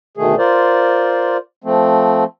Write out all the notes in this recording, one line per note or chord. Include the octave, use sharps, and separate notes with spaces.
D2 B2 D#3 A3 G#4
F4 A#4 C5 D5
F3 A3 C4